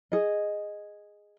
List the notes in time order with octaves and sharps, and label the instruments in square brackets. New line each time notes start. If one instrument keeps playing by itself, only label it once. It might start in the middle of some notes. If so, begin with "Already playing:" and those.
[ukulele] G#4 D#5